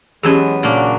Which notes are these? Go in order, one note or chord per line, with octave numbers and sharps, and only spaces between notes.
E2 F#3 G#3 B3 C#4 G4 G#4
A#2 C#3 A#3 D4 F#4